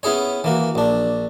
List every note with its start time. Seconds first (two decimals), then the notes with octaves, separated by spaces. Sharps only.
0.03 B3 C#4 E4 G#4 C#5
0.44 E3 A#3 F#4
0.75 A#1 D4